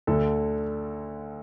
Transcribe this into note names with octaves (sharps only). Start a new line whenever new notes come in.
D2 D3 A4